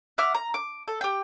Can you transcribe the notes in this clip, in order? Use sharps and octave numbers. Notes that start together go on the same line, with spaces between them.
E5 F#5 D6 F6
A#5
D6
A4
G4 G5